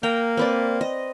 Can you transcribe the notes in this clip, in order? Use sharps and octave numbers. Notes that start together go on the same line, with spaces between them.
A#3 G5 A#5
C4 B4 D5
D#5